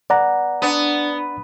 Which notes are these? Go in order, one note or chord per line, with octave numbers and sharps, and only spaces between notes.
B3 D5 F#5 A#5
B3 D4